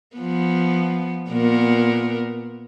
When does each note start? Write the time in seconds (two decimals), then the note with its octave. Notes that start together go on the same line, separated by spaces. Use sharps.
0.16 F3 B3
1.30 A#2 B3 A#4